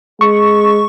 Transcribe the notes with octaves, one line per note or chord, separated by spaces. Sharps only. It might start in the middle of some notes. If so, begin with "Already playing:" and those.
G#3 C#6